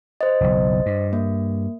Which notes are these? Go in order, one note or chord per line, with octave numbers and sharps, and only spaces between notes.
C5 D#5
F#1 B1
G2
A#3